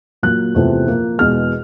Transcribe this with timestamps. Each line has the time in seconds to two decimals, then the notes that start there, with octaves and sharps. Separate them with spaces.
0.23 A#2 F#3 A#3 F#6
0.54 E2 C3 F3 A3
0.87 A#2 F3 A#3
1.18 E2 B2 G#3 F6